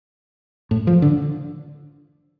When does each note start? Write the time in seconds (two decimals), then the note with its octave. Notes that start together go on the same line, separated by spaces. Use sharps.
0.71 A2
0.87 F3
1.02 D3